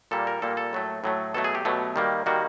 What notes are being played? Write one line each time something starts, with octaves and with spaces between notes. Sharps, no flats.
A#2 G3 A#3 A4
A#4
A#2 G3 A#3 A4
A4
A2 F#3 A3
A2 F#3 A3
B2 F#3 A3 A4
G#4
G4
B2 F#3 A3
D#3 G3 A#3
D#3 G3 A#3 F#4